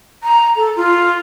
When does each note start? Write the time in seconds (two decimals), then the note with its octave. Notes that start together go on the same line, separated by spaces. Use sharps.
0.23 A#5
0.56 A4
0.76 F4